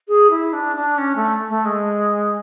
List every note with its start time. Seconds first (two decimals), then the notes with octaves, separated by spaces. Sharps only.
0.08 G#4
0.30 E4
0.53 D4
0.76 D4
0.98 C#4
1.16 A3
1.49 A3
1.65 G#3